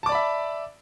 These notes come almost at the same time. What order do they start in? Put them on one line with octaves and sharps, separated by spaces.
A5 D6 D5 B5 E5